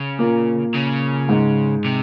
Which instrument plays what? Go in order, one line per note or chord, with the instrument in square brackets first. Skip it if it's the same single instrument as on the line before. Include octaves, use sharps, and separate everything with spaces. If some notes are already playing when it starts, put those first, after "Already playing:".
Already playing: [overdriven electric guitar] C#3
[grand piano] A#2 A#3
[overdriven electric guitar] C#3
[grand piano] G#2 G#3
[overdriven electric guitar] C3